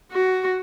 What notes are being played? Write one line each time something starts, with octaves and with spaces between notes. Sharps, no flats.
F#4